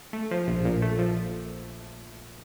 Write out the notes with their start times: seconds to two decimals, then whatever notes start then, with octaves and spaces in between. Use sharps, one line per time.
0.13 A3
0.31 F3
0.47 A#1
0.65 A#2
0.82 A3
0.99 F3